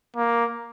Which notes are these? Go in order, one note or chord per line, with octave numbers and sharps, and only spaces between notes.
A#3